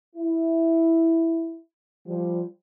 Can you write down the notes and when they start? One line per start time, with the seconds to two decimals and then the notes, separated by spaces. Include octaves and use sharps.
0.16 E4
2.06 F3 G3